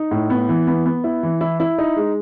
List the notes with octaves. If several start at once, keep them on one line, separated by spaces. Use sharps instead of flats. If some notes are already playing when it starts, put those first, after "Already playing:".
Already playing: D#4
A2
B3
E3
B3
B3
E4
E3
E4
E4
D#4
G#3